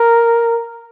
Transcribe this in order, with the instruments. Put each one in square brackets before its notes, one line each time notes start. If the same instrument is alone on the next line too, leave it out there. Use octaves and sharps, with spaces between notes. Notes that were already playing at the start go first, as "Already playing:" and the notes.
Already playing: [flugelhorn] A#4